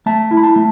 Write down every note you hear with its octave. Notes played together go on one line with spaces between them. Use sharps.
A3 A5
E4
B5
A5
A3